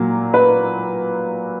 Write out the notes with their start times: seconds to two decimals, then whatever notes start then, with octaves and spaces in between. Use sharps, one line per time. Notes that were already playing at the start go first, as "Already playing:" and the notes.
Already playing: A#2 F#3 A#3
0.34 B4